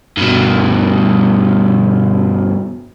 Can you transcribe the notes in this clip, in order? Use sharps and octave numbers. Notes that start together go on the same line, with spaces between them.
G2 B2